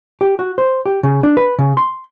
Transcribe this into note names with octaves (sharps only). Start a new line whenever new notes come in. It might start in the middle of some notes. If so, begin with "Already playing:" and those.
G4
F#4
C5
G4
C#3
D4
B4
C#3
C6